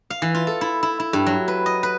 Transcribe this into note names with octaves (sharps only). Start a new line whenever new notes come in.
F5
E3
F4
A4
E4
E4
E4
G2
F#3
B4
D#5
B4